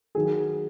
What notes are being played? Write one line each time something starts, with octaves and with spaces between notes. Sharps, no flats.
D#3 F#3 G#4